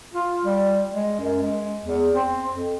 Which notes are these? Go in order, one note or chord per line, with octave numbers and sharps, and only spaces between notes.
F4
G3
G#3
F#2
G#3
E2
C4
F2